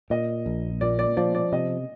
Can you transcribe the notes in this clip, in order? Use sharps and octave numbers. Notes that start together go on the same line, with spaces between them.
A#2 D#5
A#1
A#2 D5
D5
F3 D5
D5
C3 D#5